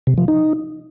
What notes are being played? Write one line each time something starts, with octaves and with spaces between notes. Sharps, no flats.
C3
F3
D#4